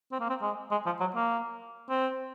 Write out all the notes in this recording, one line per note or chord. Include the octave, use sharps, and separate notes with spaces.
C4
A#3
C4
G#3
G#3
F3
F#3
A#3
C4